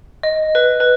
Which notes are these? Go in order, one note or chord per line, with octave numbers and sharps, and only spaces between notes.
D#5
B4
B4